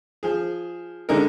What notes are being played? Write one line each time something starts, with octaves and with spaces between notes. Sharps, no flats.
F3 G#4
D3 G#3 D#4 A#4